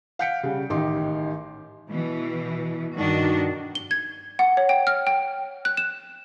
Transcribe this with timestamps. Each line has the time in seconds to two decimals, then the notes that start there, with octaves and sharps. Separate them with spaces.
0.19 F5 F#5 G6 B6 C#7 D7
0.43 C#3 G3
0.70 A1 D#3 D#4 G4 C6 D6
1.88 B2 E3
2.96 G2 D#3 D4 D#4 F#4
3.75 G7
3.91 G#6
4.39 F#5
4.57 C#5
4.69 G5
4.87 F6
5.07 G5
5.65 F#6
5.77 E7